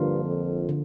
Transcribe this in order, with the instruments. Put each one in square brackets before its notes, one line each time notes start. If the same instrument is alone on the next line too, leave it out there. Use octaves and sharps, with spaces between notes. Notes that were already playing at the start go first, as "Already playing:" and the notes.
Already playing: [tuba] G2 [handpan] D3 F3 A#3 F4
[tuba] F2
[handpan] D3